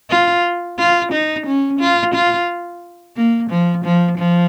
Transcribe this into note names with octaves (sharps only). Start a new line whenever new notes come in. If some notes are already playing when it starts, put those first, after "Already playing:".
F4
F4
D#4
C#4
F4
F4
A#3
F3
F3
F3